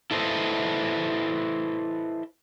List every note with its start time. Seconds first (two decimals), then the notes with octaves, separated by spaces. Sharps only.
0.11 E4 A4 B4 C5 D#5